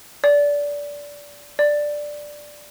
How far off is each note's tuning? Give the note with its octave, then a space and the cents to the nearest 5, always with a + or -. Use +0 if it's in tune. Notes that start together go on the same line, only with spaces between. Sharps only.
D5 -20
D5 +5